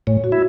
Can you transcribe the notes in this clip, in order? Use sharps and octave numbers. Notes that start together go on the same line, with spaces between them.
A2 C#5
F#4
E4